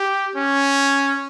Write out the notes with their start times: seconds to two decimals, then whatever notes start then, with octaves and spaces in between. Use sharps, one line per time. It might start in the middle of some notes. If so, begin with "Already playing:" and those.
Already playing: G4
0.36 C#4